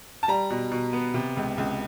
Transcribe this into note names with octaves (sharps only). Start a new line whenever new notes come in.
A5
G3 A#5
B2
B2
B3
C3
C#2
C#2